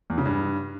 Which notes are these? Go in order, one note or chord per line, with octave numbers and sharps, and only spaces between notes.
E2
C#3
G2